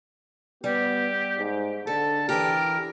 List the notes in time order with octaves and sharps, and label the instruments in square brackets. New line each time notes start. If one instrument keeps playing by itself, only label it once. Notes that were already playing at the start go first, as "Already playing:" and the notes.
[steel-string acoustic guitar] G3 [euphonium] B3 [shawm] G4
[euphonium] G#2
[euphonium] D3 [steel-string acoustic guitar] A4 [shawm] A5
[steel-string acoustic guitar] E3 G4 [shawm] A#4